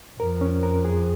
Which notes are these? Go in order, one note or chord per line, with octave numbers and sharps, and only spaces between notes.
F2 A#4
C#4
A#4
G#4